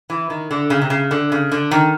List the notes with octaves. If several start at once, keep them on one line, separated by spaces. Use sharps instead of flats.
E3
D#3
D3
C#3
C3
C#3
D3
C#3
D3
D#3